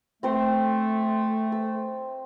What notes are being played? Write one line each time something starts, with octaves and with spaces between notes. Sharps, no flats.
A3 C4 C5
E6